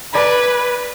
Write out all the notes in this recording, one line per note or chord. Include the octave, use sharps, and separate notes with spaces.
B4 D5 G#5 B5